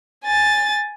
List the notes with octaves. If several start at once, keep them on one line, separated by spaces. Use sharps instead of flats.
G#5 A6